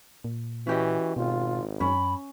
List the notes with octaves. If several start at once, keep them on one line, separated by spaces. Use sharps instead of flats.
A#2
E3 C#4 F#4 G4 D#5
G#1 B2 F4
F#2 C#4 B5